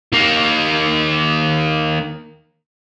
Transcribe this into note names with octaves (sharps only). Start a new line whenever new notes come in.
D#3 A#3